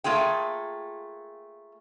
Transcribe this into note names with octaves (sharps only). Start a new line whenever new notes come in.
A3 A#3 F4 G#4 G5